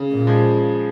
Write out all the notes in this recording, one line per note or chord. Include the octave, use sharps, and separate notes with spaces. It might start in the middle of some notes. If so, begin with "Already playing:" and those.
Already playing: C#3
A#2
F3 G#3